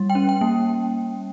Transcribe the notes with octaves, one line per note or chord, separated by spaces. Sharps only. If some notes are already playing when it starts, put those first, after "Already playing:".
Already playing: G3
G5
C#4
G5
A#3